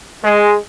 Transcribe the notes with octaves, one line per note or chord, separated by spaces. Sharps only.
G#3